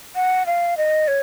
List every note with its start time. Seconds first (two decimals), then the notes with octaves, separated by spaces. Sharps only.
0.15 F#5
0.46 F5
0.77 D#5
1.08 C#5